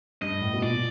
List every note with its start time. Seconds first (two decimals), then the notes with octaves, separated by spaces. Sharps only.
0.22 G2 D#5
0.42 A2
0.53 B2
0.62 A#2 D5